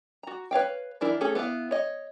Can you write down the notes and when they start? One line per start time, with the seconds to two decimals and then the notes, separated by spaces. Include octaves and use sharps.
0.23 F#4 A#5
0.51 B4 C#5 F5 G5
1.01 E3 D4 E4 A#4
1.21 A3 C#4 G#4 A4
1.35 B3 E4 B4 F5
1.71 C#5 D#5